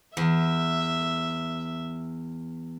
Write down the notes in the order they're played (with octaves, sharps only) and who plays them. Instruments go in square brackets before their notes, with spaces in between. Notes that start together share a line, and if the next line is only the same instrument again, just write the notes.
[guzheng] E2 [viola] E5